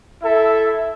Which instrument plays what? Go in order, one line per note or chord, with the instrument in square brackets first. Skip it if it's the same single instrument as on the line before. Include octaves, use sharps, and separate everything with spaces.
[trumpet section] E4 A4 E5